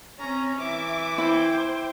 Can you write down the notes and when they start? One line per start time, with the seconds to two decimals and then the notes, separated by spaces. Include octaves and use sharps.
0.19 C4 C#4 C#5 A#5
0.59 E3 E5 D6
1.18 E4 C5 G5